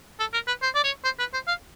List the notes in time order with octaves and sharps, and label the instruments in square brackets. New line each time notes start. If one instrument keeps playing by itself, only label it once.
[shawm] A4
A#4
B4
C5
D5
C#5
C5
B4
C5
F5